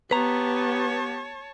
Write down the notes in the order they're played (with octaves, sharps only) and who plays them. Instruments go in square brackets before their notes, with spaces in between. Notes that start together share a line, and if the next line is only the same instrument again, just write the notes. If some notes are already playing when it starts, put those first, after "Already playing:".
[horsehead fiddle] B3 G4 [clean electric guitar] B4 A#5 [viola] C#5 A5